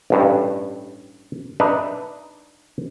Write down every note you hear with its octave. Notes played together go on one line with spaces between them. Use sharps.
A1 G2
D4 D#4 B4 E5